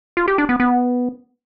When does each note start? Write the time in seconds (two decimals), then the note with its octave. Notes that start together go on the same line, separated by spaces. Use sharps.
0.17 F4
0.28 G4
0.38 D4
0.49 B3
0.60 B3